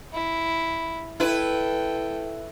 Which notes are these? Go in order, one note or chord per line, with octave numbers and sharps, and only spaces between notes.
E4
E4 A4 B4 G5